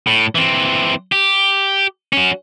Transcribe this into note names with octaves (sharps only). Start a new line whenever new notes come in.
A2
E3 C4
G4
C#4 F#4